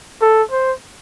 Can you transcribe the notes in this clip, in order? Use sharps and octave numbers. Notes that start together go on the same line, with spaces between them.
A4
C5